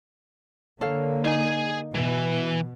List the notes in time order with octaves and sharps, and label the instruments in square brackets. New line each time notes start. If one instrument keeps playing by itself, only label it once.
[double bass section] D3 A#3 [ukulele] A4 C#5 F5
[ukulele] D#4 [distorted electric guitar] G#4 G#5
[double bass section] B2 [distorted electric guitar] E3